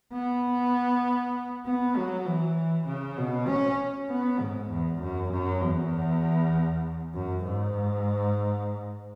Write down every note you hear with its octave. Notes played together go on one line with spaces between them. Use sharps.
B3
B3
F#3
E3
C#3
B2
C#4
B3
G#2
E2
F#2
F#2
E2
F#2
G#2